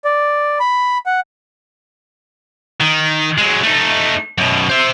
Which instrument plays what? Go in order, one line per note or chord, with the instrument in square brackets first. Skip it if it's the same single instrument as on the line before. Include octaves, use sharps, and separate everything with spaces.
[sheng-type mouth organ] D5
B5
F#5
[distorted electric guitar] D#3
F#3 G#3
A3 D#4
F#2 B2
C5 E5